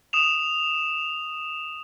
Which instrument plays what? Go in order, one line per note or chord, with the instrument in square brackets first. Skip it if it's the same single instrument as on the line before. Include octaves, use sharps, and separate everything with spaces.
[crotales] D#6 E7 F7